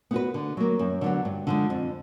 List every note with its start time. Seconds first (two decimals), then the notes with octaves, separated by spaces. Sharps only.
0.11 B3 D#4 F#4 B4
0.34 D3
0.57 F#3 A#3
0.79 F#2
1.01 D3 F#3 B3
1.25 G2
1.47 D3 F3 G#3
1.70 F2